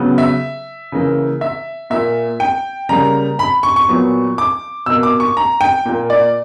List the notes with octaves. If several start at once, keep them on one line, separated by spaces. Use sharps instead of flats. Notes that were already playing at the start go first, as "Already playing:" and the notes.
Already playing: C#3 F#3 B3
E5
C#3 E3 A#3
E5
A#2 A#3 E5
G5
C#3 G3 A#3 A#5
B5
C#6
C#6
A#2 F#3 B3
D6
B2 A#3 E6
D6
C#6
A#5
G5
A#2 A#3
D5